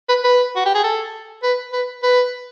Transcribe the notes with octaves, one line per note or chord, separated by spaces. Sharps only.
B4
B4
F#4
G4
G#4
A4
B4
B4
B4